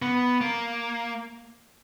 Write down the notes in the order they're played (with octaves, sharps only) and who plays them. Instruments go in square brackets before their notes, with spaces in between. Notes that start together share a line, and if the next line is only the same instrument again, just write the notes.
[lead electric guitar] B3
A#3